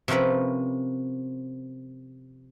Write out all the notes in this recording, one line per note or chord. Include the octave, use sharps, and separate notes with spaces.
C3 F3 C#4 A#4 B4